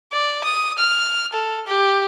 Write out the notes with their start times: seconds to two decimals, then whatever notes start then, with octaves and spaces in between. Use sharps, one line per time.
0.12 D5
0.44 D#6
0.78 F6
1.33 A4
1.67 G4